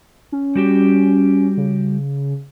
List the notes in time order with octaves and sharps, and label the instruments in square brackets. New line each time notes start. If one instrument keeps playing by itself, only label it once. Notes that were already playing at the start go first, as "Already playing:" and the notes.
[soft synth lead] C#4
[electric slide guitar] G3 F#4 G4
[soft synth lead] C#3